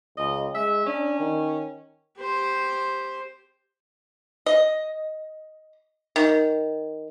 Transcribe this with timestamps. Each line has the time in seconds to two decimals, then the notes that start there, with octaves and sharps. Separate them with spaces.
0.17 C#2 D#5
0.55 G#3 E5
0.86 C#4 D4
1.20 D#3
2.18 G4 C5
4.46 D#5
6.16 D#3